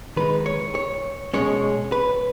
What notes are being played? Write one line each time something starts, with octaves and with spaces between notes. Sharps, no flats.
D#3 G#3 D#4 B4
C#5
C#5
B2 G#3 C#4 C#5
B4